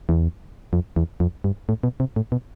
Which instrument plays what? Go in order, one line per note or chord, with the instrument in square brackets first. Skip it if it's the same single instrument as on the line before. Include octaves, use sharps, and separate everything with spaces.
[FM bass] E2
F2
E2
F2
G2
A2
B2
C3
A2
B2